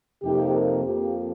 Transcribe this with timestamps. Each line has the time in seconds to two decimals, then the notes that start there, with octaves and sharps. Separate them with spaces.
0.22 F2 C3 F3 A#3 D#4 G4
0.53 A#4
0.84 F2 F3 A#3 G4